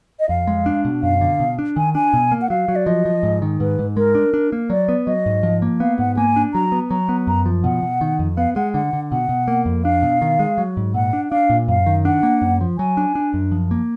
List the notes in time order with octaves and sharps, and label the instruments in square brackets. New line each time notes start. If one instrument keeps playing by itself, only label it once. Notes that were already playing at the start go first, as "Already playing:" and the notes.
[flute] D#5
[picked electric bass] F2 [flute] F5
[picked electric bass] G#3
D4
B2
[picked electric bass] F#2 [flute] F5
[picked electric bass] D3
B2
D4
[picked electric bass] D#3 [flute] G#5
[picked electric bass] D4 [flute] G#5
[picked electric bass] B2
A#3
[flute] F#5
[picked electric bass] F#3 [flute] F5
[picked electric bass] F#3
[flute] D5
[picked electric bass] F3 [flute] D#5
[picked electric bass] F3
G#2
D#3
[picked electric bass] G#2 [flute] B4
[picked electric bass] G#2
[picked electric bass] G#3 [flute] A#4
[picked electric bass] D4
D4
A#3
[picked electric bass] F#3 [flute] D5
[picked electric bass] B3
[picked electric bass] F#3 [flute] D#5
[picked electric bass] G#2
F3
A#3
[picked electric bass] B3 [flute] F5
[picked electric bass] G#2 [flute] F#5
[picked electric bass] A#3 [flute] G#5
[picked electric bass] D4
[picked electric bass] F#3 [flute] A#5
[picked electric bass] B3
[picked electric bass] F#3 [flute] A#5
[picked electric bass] B3
[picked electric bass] F#2 [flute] A#5
[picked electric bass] F3
[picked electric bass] B2 [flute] F#5
[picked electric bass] B2
D#3
F2
[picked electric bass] B3 [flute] F5
[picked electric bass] G#3 [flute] F#5
[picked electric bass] D3 [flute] F#5
[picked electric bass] D3
[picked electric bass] B2 [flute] F#5
[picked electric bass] B2
A#3
F2
[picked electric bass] D4 [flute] F5
[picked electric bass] B2
D#3
G#3
F#3
G#2
[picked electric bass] A#2 [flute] F#5
[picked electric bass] D4
[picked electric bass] D4 [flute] F5
[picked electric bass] A#2
[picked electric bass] F#2 [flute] F5
[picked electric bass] D#3
[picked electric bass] D4 [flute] F#5
[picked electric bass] A#3
F#2
F3
[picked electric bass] F#3 [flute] G#5
[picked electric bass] D4
D4
F#2
F3
A#3